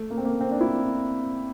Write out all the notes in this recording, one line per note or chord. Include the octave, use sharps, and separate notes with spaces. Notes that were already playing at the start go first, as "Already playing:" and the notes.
Already playing: A3
A#3
C4
A#3
C4
D4
E4